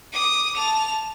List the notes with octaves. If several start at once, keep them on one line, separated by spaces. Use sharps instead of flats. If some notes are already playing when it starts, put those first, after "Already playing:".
D6 D#6
A5 F7